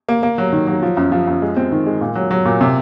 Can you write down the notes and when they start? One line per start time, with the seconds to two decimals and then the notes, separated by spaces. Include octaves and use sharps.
0.09 A#3
0.23 A#3
0.38 F#3
0.53 D#3
0.67 F#3
0.83 F3
0.97 F#2
1.12 F3
1.27 F#2
1.42 G#3
1.56 C4
1.72 D#3
1.86 G#3
2.01 A#2
2.15 F#3
2.31 F#3
2.45 A#2
2.61 C3